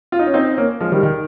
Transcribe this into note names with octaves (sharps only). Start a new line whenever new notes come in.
F4
D#4
C#4
C4 D#4
A#3 C#4
F3 G#3
D#3 G3
D#3